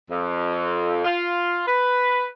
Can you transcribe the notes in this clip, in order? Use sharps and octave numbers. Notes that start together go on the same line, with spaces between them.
F2
F4
B4